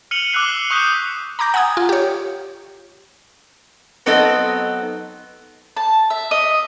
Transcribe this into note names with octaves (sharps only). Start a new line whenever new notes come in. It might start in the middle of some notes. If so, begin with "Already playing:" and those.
F6 C#7 D#7 F7 F#7
D6 E6 F#6 C7 G7
C#6 D#6 F#6 G6 B6 C#7
A#5 B5 D6 G6 A#6
F#5 G#5 A#5 D#6 G#6
F4
G4 C#5
F#3 B3 C4 D#4 A4 D#5
A5
E5
D#5